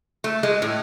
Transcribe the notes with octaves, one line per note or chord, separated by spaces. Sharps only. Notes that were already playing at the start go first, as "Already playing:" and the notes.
A3
G#3
A2